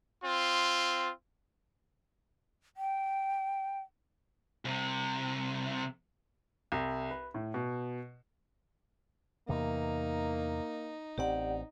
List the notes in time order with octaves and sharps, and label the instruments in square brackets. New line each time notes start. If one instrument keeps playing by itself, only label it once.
[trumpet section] C4 F4
[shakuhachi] G5
[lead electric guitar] C2 C3
[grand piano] C2
B4
A2
B2
[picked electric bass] E2 C3 E3 [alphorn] A#3 [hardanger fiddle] D#4
[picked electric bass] A1 C4 [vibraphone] G4 D5 F#5